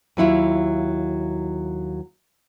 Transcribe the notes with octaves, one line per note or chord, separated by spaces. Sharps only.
D#2 F#3 E4 F4